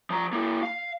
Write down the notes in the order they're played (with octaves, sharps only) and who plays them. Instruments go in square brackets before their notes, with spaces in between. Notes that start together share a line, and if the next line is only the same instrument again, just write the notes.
[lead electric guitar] F3 A#5
A#3 E4
F5